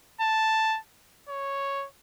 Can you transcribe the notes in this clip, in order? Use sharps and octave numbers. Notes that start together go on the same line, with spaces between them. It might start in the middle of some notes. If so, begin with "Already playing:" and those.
A5
C#5